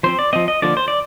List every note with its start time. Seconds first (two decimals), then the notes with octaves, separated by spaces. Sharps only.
0.03 F3 C4 C5
0.19 D5
0.33 F3 C4 D#5
0.48 D#5
0.62 D3 F3 A#3 D5
0.77 C5
0.88 D5